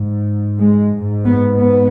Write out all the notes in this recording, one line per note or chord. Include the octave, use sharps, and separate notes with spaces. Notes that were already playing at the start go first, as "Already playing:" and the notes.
Already playing: G#2
G#3
G#2
B3
B3